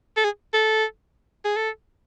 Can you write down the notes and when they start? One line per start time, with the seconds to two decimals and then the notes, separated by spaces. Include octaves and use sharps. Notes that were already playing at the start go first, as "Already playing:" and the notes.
0.17 A4
0.24 G#4
0.53 A4
1.45 G#4
1.56 A4